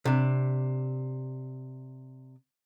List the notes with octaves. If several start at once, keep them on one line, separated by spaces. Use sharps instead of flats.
C3 D4